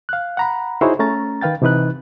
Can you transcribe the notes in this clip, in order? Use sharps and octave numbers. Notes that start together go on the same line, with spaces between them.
F5 F#6
F#5 A#5 B5
D#4 E4 F#4 G#4 C5 C#5
A3 C#4 A#5 A6
D#3 B4 F5 G5 A6
C3 E3 D#4 B4 F#6